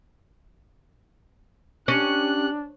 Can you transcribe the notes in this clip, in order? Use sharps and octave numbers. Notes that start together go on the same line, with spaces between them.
C#4 D4 G4 F#6